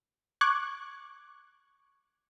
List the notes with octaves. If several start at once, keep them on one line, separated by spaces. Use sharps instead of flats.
C#6 D6 F#6 G#6